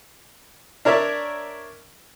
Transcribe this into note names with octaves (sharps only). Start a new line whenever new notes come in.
D4 A#4 C#5 D5 E5